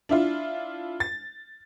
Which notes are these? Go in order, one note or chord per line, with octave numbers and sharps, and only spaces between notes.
D4 E4 F4
A6